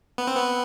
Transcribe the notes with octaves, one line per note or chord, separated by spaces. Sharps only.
B3
C4
B3